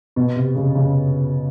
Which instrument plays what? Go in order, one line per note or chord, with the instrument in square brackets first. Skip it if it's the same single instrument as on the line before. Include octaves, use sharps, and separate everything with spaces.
[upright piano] B2
C3
C#3
C#3